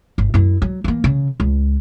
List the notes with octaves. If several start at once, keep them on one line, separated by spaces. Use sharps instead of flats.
G1
F#2 E4
F#3
E3 A#3
C#3
C#2